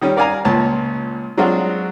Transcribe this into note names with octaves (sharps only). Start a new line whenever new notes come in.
D#3 G3 C#4
A#4 D5 F5 G#5 A#5
C#2 A#2 C#5 A5
F#3 G#3 C4 D4 F4 F#4